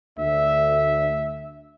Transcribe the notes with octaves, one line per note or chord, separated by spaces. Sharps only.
D2 E5